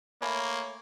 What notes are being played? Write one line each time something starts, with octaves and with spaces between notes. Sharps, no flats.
A3 A#3 C#5 G#5 B5